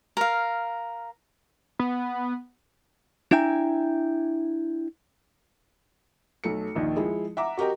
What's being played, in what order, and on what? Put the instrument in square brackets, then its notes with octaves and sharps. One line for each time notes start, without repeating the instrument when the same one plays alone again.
[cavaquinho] A#4 F5
[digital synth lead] B3
[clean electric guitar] D4 E4 E5 G5 G#5 A#5
[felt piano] B1 A3 C#7
A#1 D#2 D#3
F3 G#3 E4
E5 F#5 A#5 D6
F#4 G4 A#4 D#5 G5